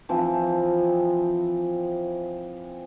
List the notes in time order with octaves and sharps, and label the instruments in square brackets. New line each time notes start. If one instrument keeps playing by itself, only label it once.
[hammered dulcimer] E3 F3 C4